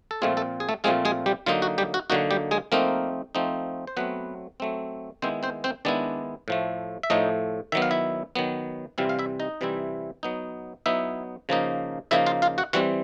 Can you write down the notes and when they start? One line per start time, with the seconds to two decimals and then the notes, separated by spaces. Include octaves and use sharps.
0.11 A4
0.22 A#2 F3 G#3 A3 C4 F4 G#4
0.37 A3 A4
0.60 G#4
0.69 A3 A4
0.84 A#2 F3 G#3 A3 C4 F4 G#4
1.05 G#3 G#4
1.26 G3 G4
1.46 D3 F#3 A#3 D#4 F4
1.62 F#4
1.78 G3 G4
1.94 F#4
2.10 D3 F#3 A#3 D#4 F#4
2.31 G3 G4
2.51 G#3 G#4
2.72 F3 A3 A#3 C4 D#4 A#4
3.35 F3 A3 C4 D#4
3.87 C5
3.97 F#3 A3 B3 C4 B4
4.60 F#3 A3 C4
5.22 D#3 G#3 B3 C4 E4 C5
5.43 C4 C5
5.64 C4 C5
5.85 D#3 G#3 B3 D4 E4 D5
6.48 A2 F3 A3
7.03 E5
7.10 A2 F3 A3 D#4 D#5
7.72 D#3 F#3 B3 E5
7.82 F5
7.91 E4 E5
8.35 D#3 F#3 B3
8.98 C3 E3 G3 C4 E4 F4 F5
9.09 F5
9.19 E4 E5
9.40 D#4 D#5
9.61 C3 E3 G3 C4 E4
10.23 F#3 B3 D#4
10.86 F#3 B3 D#4 E4 E5
11.49 C#3 F3 A#3 D#4
12.11 C#3 F3 A#3 D#4 E4 E5
12.26 F4 F5
12.42 F4 F5
12.58 F#4 F#5
12.73 E3 G3 C4 F#4 F#5